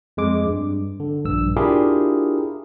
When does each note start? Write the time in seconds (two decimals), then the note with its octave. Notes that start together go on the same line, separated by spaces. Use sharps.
0.17 F2 G#3 D6
0.46 G2
1.00 D3
1.25 A#1 G2 E6
1.57 D4 E4 F4 G4 G#4 A#4